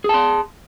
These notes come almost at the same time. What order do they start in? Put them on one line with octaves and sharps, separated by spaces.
G#4 A5 C6